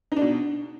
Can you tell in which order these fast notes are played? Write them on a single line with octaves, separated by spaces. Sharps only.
D#4 D4 B2